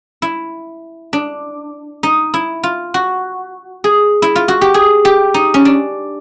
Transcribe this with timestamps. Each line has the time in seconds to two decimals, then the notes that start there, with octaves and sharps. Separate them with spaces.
0.22 E4
1.13 D4
2.03 D#4
2.34 E4
2.63 F4
2.94 F#4
3.84 G#4
4.22 E4
4.35 F4
4.48 F#4
4.61 G4
4.74 G#4
5.05 G4
5.34 D#4
5.54 C#4
5.65 D4